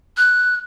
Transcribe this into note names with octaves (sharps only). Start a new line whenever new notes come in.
F#6